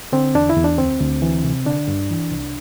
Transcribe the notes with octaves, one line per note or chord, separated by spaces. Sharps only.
D3 C4
E2 D4
E4
E2
D4
D2 C4
D2
E3
C3
D3 D4
G2
E3
C2